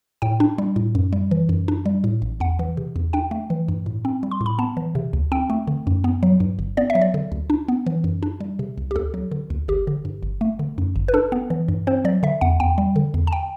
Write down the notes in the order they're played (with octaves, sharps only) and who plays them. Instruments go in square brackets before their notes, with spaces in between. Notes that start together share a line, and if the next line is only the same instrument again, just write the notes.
[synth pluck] A2 G5
D4
G3
A2
F#2
G3
E3
F#2
D4
G3
A2
A1
E2 F#5
E3
C3
E2
D4 G5
A3
E3
G2
A2
C4
G3
C6
A2
B5
B3 A5
E3
C3
D2
C4 G5
A3
D3
F#2
B3
F#3
G2
G1
B3 D5
E5
F#3
D5
D3
D2
D4
B3
E3
F#2
D4
G3
C3
C2
G4
D2 A4
F#3
D3
D2
G1 G4
D3
G2
G1
A3
D3
F#2
G1
B4
D4 A4
B3
E3
G2
C4 C5
F#3 D5
D3 E5
E2 F#5
E2 G5
G3
D3
E2
A5
G5